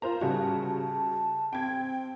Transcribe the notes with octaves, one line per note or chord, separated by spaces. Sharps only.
F4 A#4 C5 A#5
C#3 G3 F#4 A5
C4 G5 G#6